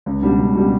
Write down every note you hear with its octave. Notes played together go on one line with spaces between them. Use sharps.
C#2
B2 G3 D4
C#2
B2 G3 D4